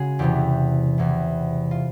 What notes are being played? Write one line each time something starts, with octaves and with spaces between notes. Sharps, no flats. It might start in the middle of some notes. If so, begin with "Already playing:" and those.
Already playing: C#3 G#3 F#4 G#4
E2 C3 E3 G4
E2 C3 E3
F4